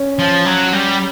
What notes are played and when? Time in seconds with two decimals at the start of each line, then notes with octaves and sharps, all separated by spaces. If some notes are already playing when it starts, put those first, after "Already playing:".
Already playing: C#4
0.19 F3
0.45 F#3
0.73 G3